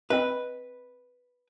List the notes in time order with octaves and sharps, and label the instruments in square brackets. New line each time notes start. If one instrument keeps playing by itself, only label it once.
[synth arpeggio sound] C4 D#5 [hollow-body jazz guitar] B4